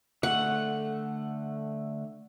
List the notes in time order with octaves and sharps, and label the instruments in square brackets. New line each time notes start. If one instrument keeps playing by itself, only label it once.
[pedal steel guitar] D3 A3 [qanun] F#5